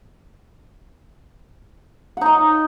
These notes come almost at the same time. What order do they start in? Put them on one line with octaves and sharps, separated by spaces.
F#5 D#4 D#5